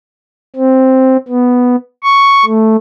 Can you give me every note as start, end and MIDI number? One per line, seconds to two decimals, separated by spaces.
0.56 1.17 60
1.28 1.76 59
2.03 2.45 85
2.45 2.76 57